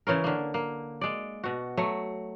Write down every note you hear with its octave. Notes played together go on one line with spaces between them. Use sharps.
C#3 E3 C#4 A#4
D3 A#3
A#3
G#3 D5
B2 F#4
F#3 A3